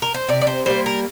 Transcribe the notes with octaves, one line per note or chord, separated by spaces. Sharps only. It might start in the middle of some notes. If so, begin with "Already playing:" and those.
A#4
C5
C3 D5
D5
C5
G3 A#3 C5
A#4